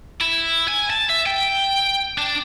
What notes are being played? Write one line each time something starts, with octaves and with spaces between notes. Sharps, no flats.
E4
G#5
A5
E5
G5
D4